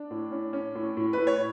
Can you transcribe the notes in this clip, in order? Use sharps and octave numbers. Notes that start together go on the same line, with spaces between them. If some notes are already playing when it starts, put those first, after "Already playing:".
Already playing: D4 D5
A2
C#4
C#4
A2
A2
A2 B4
C#5